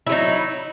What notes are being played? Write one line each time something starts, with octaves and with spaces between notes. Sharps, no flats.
F#3 D#4 E4